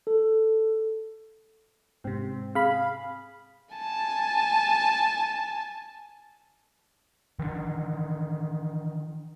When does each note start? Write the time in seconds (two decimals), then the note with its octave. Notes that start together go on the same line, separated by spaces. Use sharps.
0.07 A4
2.04 G#2 C3 C4
2.55 G#4 F5 B5
3.75 G#5 A5
7.39 D#3 E3 A3 D4